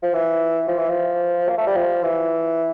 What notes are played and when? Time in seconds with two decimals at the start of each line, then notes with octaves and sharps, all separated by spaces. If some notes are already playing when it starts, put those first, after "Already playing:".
0.03 F3
0.13 E3
0.68 F3
0.78 E3
0.89 F3
1.48 A#3
1.58 A3
1.67 G3
1.76 F3
2.03 E3